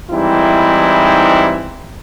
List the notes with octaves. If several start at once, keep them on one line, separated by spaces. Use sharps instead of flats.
G#2 E3 G3 C4 D#4 E4